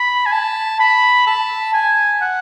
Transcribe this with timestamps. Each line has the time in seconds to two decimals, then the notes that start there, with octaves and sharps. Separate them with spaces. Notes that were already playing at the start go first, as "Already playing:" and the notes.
Already playing: B5
0.26 G#5
0.32 A5
0.79 B5
1.27 A5
1.74 G#5
2.21 F#5